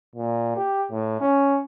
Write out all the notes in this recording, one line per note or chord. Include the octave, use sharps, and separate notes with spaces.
A#2
G4
A2
C#4